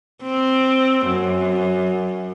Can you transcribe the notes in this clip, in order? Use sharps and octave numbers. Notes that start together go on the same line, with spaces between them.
C4
F#2